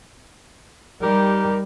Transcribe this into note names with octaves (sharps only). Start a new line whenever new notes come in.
G3 D#4 G4 A#4